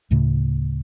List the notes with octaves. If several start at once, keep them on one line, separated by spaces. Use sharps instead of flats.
D2 A2 C#3 A3